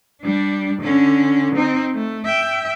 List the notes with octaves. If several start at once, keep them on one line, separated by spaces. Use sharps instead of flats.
G3 D4
D3 C#4
C4 D#4
A3
E5 G5